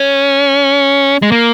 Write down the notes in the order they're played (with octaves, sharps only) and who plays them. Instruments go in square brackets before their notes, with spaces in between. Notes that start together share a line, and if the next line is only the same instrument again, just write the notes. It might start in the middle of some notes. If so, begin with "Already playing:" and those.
Already playing: [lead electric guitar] C#4
G#3
A#3